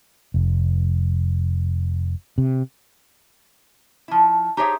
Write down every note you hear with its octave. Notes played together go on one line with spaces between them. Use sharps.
F1
C3
F3 E4
D#4 G4 G#4 C5 C#5 E5